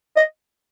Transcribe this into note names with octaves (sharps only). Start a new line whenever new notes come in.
D#5